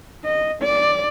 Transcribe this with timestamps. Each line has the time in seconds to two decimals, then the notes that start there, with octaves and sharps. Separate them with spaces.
0.24 D#5
0.62 D5